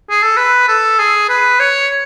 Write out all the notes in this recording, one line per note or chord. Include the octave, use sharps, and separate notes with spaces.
G#4
A4
B4
A4
G#4
B4
C#5